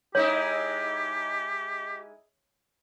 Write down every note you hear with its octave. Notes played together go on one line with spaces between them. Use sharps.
G#3 D#4 E4 G4 C#5